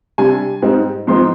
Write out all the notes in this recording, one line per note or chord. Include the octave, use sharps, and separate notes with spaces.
C3 G3 D4 G#5
G#2 G3 C4 D#4
G#2 F3 C4 D#4 C6